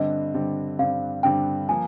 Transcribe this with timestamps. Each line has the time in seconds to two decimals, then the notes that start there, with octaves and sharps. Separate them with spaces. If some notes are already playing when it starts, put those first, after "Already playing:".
Already playing: G2 D3 G3 C4 D#5
0.34 G2 D3 G3 C4
0.79 G2 D3 G3 C4 F5
1.23 G2 D3 G3 C4 G5
1.69 F3 A#3 G#5